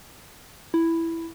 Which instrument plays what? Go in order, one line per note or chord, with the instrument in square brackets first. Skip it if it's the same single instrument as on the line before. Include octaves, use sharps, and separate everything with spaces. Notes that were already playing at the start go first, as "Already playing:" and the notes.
[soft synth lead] E4